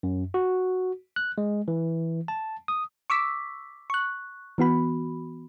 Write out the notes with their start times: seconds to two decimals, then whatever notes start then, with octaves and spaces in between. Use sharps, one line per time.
0.03 F#2
0.34 F#4
1.16 F#6
1.38 G#3
1.68 E3
2.28 A5
2.68 D#6
3.10 C#6 D6 E6 B6
3.90 C#6 F#6
4.58 E3 B3 F#4 B5